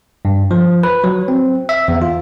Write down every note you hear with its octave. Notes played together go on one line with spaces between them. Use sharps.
G2
F3
B4
F#3
C4
E5
E2
F4